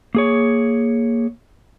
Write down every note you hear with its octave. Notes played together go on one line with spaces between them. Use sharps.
A#3 G#4 C#5